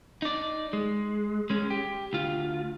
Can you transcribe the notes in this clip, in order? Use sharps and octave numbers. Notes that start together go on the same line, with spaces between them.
D#4 D5
G#3
G#3 C#4
G4
D2 F4